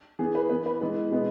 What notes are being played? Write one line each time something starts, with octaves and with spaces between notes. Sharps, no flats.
E3 B3 G#4
B4
E3 B3 B4
B4
E3 G#3 B3
B2 G#3 B3